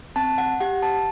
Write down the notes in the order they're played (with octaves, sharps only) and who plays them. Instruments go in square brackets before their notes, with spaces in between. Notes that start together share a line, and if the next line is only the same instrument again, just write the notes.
[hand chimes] C4 A5
F#5
G4 F#5
A5